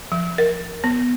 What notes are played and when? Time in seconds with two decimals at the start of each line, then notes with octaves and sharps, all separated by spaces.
0.12 F3
0.38 A#4
0.84 B3